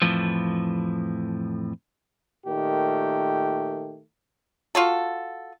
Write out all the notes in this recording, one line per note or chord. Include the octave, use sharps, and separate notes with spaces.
F2 A2 E3 F3
A#2 D#3 A3 G4
F4 F#4 A4